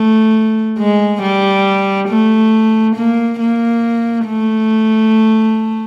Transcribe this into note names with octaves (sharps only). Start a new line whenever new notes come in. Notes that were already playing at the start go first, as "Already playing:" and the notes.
Already playing: A3
G#3
G3
A3
A#3
A#3
A3